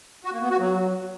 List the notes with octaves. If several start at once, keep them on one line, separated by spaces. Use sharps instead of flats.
F#4
A#3
B3
F#4
F#3